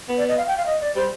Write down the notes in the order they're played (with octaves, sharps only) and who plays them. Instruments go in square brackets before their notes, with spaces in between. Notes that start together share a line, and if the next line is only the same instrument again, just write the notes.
[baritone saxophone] B3
[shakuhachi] D5
D#5
F5
G5
F5
D#5
D5
[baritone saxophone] G3 [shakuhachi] C5